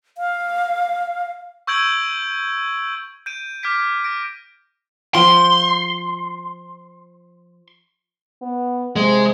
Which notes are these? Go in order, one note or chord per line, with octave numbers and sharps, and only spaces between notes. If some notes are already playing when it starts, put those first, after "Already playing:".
F5
C#6 E6 G6 G#6 D7 F#7
G6 D7 D#7
D6 F6 G6 G#6 B6 D7
A#6 D7
F3 C5 C6
B3
C3 G#3